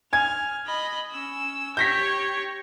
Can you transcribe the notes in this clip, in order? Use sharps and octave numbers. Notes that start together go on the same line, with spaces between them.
G#5 F6 G#6
D#5 B5
C#4 E6
G4 C#5 G6 A#6 B6